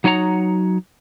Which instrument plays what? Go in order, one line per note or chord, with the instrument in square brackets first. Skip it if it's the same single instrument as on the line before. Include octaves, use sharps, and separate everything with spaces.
[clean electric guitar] F#3 D#4 C#5 F#5 A#5